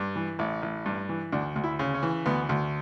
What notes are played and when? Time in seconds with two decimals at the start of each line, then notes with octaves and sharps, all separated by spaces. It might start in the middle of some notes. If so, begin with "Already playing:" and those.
Already playing: G2
0.16 E3
0.39 A1
0.62 A1
0.86 G2
1.09 E3
1.32 D2 D4
1.56 D2
1.64 E4
1.79 C#3
1.94 C#4
2.03 E3
2.26 D2 B3
2.49 D2